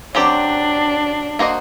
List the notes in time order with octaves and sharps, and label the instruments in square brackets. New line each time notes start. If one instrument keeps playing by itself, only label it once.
[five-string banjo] F#3 C4 G4 D5 [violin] D4
[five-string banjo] A#3 F#4 C5 D#5